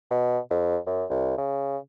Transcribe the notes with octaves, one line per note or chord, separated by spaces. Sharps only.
B2
F2
F#2
C2
C#3